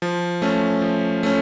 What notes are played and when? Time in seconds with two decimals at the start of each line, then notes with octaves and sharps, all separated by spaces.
0.02 F3
0.42 A3 C#4
0.82 F3
1.23 A3 C#4